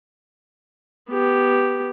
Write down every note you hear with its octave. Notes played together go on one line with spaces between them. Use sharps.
B3 G4